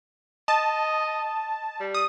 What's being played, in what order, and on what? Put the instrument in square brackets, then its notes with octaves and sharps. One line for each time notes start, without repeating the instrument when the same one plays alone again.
[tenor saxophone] D#5 [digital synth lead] A5
[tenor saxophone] G3
[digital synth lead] D#6